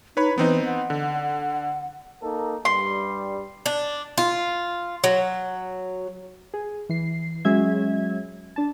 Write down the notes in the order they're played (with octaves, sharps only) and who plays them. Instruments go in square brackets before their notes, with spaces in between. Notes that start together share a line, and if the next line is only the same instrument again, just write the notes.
[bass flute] D#4 [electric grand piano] B4 C#5 B5
[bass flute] E3 [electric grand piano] B3 C4 D#4
[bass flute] F#5
[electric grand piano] D3
[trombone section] A#3 D#4 A4
[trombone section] G2 G3 [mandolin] C6
[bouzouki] D4
F4
F#3
[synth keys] G#4
E3 C7
F#3 G#3 C#4 E5 G#6
D4 A5